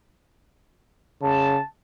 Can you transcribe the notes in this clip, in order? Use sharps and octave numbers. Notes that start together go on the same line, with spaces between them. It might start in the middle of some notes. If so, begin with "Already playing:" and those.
C#3 A5